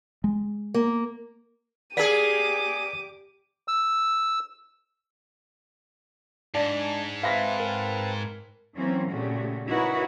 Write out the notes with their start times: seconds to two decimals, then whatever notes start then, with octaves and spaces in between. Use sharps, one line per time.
0.24 G#3
0.74 A#3
1.97 A#3 G4 G#4 D5 D6 B6 D#7
3.68 E6
6.55 G#2 D4 A5
7.23 C4 B4 E5 F5 A5 A#6 B6
7.60 A#4
8.75 E3 F#3 A#3 C4 C#4
9.11 A#2 C#3 A3 C#4 F#4 G4
9.67 D#4 E4 F#4 A#4 B4 C#5